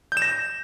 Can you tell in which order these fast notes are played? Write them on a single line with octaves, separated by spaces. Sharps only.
G6 E7 A#6